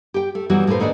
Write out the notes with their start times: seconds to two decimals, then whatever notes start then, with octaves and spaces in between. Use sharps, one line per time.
0.14 G4 G5
0.35 A3
0.50 E3 F#3 G3 B3 F#4
0.67 A2 A3 A#3 B4 C5
0.80 D#2 G#2 A3 D4 D5 D#5